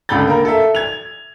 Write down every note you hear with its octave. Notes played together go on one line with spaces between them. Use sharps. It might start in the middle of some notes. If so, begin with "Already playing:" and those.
C#2 D3 A4 B5 G6 A6
A#3 A#4
A4 E5
G#6 F7